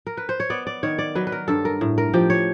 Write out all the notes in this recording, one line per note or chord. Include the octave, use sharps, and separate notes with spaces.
A#4
B4
C5
C#5
B3 D5
D5
D#3 C#5
D5
F#3 B4
B4
A#4
G2 A4
A#4
A2
A#4
F3 G4
C#5